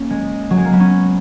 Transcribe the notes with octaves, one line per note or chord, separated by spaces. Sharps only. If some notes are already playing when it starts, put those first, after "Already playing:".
Already playing: A#3 C#4
G#3
F#3
G#3
A#3
B3
C#4